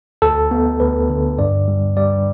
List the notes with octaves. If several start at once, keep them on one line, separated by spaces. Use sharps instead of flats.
D2 A4
B3
D2 B4
D3
G2 D5
G3
G3 D5